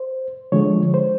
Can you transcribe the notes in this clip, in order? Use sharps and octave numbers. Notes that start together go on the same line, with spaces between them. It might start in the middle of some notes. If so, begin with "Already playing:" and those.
Already playing: C5
D3 F3 G#3 C#5
C5